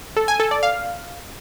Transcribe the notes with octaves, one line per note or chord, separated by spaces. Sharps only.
A4
G#5
A4
D5
F5